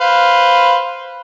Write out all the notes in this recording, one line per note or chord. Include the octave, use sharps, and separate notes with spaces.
B4 C5 F5